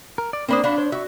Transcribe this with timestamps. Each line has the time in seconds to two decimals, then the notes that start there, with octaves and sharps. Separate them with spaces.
0.18 A#4
0.33 D5
0.48 A#3 C4 D4 C5 B5 D#6
0.64 D4 F#4 F5 B5
0.78 C5 C#5
0.92 F#4 E5 C#6